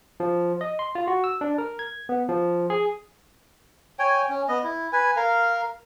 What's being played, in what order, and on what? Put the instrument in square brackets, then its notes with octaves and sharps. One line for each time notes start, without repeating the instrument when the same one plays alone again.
[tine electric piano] F3
D#5
C6
F4
F#4
E6
D4
A#4
G#6
B3
F3
G#4
[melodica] C#5 G5 G#5
C#4
B3 D#5
E4
B4 G#5
A#4 F5